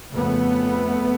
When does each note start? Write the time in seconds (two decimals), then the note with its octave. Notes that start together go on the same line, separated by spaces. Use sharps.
0.12 F2 C#3 A3 B3